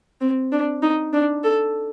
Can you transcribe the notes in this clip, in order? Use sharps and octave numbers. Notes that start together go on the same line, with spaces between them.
C4
D4
D#4
D4
A4